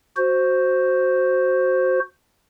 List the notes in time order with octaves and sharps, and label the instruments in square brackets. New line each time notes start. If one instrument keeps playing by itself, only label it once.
[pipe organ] F#4 C5